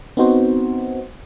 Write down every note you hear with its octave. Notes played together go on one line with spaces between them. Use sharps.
B3 C4 D#4 F#4 C5